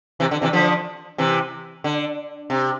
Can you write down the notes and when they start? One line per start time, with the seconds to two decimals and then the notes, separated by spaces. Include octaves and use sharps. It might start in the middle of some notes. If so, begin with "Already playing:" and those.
0.20 C3 E3
0.31 D3
0.42 C3 E3
0.53 D3 F3
1.18 C3 E3
1.84 D3
2.50 C3